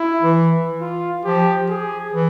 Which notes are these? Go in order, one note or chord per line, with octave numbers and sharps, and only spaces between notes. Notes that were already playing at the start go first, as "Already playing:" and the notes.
Already playing: E4
E3
F4
F3 G4
G#4
E3